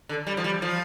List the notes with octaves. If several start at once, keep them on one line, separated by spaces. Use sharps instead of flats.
D3
G3
F3
G3
F3